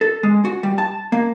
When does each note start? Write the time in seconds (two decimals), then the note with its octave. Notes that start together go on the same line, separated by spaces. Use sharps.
0.01 A4
0.23 G#3
0.45 F#4
0.63 G3
0.78 A5
1.12 A#3